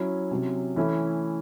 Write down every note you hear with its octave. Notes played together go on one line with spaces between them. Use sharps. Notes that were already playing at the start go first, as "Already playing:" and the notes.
Already playing: F#3 C#4 E4
C3 F#3 C#4
E3 A3 C#4 E4